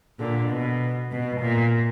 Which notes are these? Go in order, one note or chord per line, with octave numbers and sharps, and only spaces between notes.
A#2 D3
B2
B2
A#2